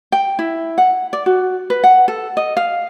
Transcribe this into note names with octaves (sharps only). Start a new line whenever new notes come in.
G5
E4
F#5
D5
F#4
B4
F#5
A4
D#5
F5